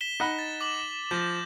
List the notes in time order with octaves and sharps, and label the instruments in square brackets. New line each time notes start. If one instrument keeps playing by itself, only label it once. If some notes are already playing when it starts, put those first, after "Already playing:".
[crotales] B6 E7 G7
[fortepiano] D#4 F#5 B5
[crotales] A6
D6 E7 F#7
[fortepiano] F3 [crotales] G6 A#6